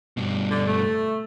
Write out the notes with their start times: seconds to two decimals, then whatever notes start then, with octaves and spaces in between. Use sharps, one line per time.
0.17 G2 B2
0.51 D3 D5
0.67 A3